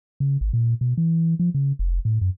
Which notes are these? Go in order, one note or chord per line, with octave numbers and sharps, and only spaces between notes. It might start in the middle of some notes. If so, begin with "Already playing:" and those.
C#3
G#1
A#2
B2
E3
F3
C#3
F1
A2
F#2